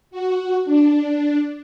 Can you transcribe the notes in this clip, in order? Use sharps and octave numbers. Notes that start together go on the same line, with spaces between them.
F#4
D4